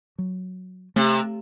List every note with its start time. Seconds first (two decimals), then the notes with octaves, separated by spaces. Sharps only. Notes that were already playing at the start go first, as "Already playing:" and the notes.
0.18 F#3
0.96 C3 A3